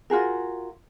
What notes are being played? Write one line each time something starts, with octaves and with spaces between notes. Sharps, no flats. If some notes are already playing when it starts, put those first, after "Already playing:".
F4 F#4 G#4 A#4